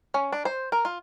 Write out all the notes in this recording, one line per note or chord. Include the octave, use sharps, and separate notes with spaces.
C#4
D4
C5
A#4
F4